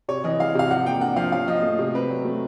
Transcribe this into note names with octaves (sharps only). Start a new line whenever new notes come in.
C3 C#5
E3 D#5
G#3 F5
C3 F5
F3 F#5
A#3 G5
D4 F#5
F3 F5
C#4 F5
F3 D#5
A3
C3
C4 B4
F#3
A3